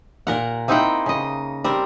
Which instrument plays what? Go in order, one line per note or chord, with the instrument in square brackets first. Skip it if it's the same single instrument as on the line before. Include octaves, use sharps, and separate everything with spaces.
[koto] A#2 A#4 F#5
A#3 C4 D#4 E4 F#5 G5
C#3 D#5
G3 C4 A#4